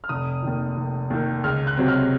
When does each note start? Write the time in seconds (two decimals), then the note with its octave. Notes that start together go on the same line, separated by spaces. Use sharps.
0.04 F6
0.09 F1 D#6
0.43 D#2 D#3
0.77 F1
1.10 D#2 D#3
1.44 C#2 F6
1.67 F#6
1.77 C3 F#3 C4
1.88 F6